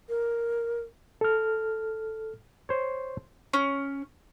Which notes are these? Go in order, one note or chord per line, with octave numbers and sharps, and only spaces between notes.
A#4
A4 F6
C5 C#5
C#4